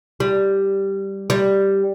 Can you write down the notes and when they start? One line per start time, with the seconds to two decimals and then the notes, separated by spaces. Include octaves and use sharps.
0.20 G3
1.30 G3